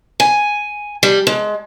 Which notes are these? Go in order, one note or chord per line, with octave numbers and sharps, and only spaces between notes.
G#5
G3
G#3